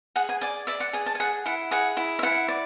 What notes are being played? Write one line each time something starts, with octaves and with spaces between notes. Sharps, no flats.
G#4 F#5
G#5
D5 G#5
D5 E5
F#5
G#4 G#5
A5
G#5
G#4 F#5
E4 F#5
G#4 F#5
E4
E5
E4 F#5
D5